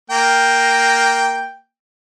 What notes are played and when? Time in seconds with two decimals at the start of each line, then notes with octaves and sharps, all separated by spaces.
0.10 A#3 G5